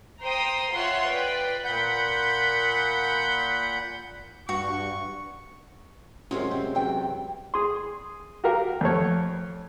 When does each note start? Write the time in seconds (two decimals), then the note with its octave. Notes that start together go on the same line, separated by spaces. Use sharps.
0.21 C5 G5 A#5 C6 D#6
0.73 F4 C#5 E5 F#5 C6
1.09 B4 D5 G5
1.65 A#2 F#5 B5 G6
4.49 G2 F#4 C#6
6.31 F#2 C3 G#3 F4
6.51 C4
6.75 E2 F#3 G5
7.54 G#4 C6
8.44 F#4 G4 A#4 F5
8.81 F2 A3 C#5